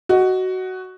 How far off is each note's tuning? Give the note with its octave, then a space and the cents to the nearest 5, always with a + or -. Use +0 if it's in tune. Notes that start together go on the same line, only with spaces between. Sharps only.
F#4 +10 D#5 +0